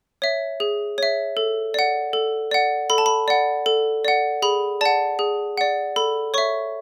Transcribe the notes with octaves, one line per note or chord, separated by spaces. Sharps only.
C#5 E5
G#4
C#5 E5
A4
D5 F#5
A4
D5 F#5
A4 B5
A5
B5
D5 F#5
A4
D5 F#5
G#4 B5
D5 F#5 A5
G#4
D5 F#5
A4 B5
C#5 E5 C#6